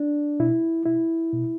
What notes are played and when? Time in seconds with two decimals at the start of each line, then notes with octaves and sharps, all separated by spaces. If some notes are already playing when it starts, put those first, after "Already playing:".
Already playing: D4
0.40 B2 E4
0.86 B2 E4
1.33 B2